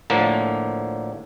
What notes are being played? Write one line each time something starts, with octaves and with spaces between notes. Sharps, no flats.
A2 D3 F3 A#3